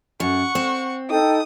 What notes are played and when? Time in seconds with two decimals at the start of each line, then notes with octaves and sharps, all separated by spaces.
0.20 F#2 F#5 C#6
0.55 C4
1.10 D#4 A4 G5 D#6